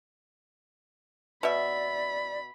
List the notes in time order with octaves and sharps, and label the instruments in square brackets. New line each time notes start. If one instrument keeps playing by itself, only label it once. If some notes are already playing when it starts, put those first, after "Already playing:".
[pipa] B2 E5 [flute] D5 [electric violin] B5